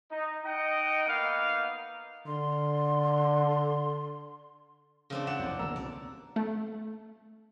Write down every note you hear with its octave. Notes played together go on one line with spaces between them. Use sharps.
D#4
D#4 D#5 F#5 G5
A#3 B3 D#4 F5
D3 C6
C#3 C4 D4
D5 F#5 E7
F1 E2
D#2 D3 A#3 A#5 E6
C2 B2 D5
A3